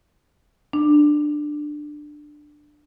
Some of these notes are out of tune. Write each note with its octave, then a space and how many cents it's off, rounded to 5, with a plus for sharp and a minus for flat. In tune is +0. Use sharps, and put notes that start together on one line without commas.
D4 +15